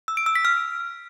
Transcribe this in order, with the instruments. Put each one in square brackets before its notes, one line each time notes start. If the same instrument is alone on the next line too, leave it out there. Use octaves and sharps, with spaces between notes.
[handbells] E6
D7
E6
B6
F6